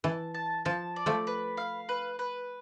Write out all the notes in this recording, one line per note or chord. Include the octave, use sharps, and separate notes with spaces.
E3 A5
A5
F3 A5
D5
F3 A3
B4
F5
B4
B4